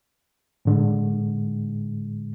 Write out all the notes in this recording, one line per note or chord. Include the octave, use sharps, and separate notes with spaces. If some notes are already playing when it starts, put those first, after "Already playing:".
A2 D3 G#3